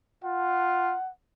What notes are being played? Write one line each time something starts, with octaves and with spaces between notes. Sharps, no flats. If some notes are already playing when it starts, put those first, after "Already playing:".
F4 F#5